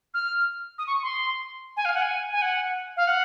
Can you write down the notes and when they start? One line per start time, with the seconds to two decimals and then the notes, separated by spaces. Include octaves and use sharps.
0.14 F6
0.78 D#6
0.87 C#6
1.03 C6
1.77 G#5
1.85 F5
1.94 F#5
2.02 G#5
2.32 G#5
2.42 F#5
2.97 F5
3.07 F#5